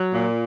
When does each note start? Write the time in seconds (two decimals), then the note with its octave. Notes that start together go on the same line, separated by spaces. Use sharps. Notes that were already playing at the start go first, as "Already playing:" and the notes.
Already playing: F#3
0.13 A#2